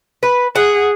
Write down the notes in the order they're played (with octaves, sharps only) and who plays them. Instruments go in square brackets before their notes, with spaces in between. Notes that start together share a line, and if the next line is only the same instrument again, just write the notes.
[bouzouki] B4
[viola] G#4 [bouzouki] F#5